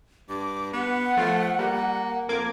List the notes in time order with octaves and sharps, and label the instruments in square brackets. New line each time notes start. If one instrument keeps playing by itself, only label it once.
[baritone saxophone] G2 [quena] D6
[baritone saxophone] B3 [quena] F#5
[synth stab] F3 F4 [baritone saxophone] A3
[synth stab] G3 [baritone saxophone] A#3
[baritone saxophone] F2 [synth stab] A#3 D6 G#6